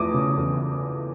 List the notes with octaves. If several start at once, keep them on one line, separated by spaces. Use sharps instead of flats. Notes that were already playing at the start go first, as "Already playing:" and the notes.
Already playing: E2 F3 A3 D6 D#6
C#3
E2